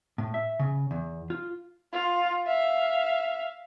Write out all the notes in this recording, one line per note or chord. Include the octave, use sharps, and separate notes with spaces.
A2
E5
C#3
E2
F4
F4
E5 F5